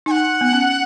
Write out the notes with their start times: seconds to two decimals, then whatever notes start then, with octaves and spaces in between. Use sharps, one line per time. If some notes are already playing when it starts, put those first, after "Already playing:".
0.06 D#4 G#5
0.11 F#5
0.41 B3
0.53 C#4